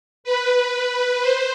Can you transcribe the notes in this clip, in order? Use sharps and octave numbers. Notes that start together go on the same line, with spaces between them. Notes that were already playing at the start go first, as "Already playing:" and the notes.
B4
C5